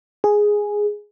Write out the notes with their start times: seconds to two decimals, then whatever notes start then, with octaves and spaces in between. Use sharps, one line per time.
0.24 G#4